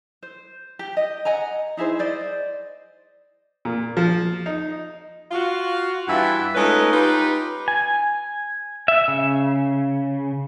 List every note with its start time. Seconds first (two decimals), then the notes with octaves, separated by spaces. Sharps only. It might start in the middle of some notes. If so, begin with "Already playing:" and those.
0.23 C5
0.79 G4
0.97 D#5
1.25 D#5 F#5 G#5 A#5
1.77 D#4 E4 G#4 C5
1.99 C5 D5 D#5
3.65 A#2
3.97 F3
4.46 D#4
5.32 F4 F#4 F5
6.08 G2 E3 F4 E5 F#5
6.55 G#3 A3 C#4 D#4 F4 B4
6.93 D#4 F4 G4 B4
7.68 G#5
8.88 E5
9.08 C#3